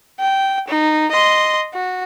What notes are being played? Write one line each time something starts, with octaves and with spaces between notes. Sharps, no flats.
G5
D#4
D#5 C6
F#4